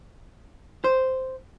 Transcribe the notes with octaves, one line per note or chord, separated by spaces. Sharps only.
C5